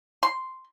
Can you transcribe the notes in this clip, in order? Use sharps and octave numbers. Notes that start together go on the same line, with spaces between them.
C6